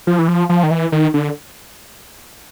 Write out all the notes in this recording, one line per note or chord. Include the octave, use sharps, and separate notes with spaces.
F3
E3
F3
F3
D#3
E3
D#3
D3